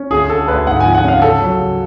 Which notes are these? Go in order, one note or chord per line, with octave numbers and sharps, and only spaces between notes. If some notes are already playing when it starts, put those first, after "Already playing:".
Already playing: C#4
D2 G#4
D3 A4
D2 B4
G#2 F#5
G#5
F3
F#5
C#4 F5
C#3 A4
F#3
C#3